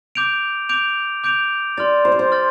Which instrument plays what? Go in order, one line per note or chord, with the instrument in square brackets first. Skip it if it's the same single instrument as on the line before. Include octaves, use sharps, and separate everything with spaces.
[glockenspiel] D6 G6 D7 F7
D6 G6 D7 F7
D6 G6 D7 F7
[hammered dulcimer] D5 [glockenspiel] C6 F6 A6
[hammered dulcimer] C5
D5
C5
[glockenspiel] C6 F6 A6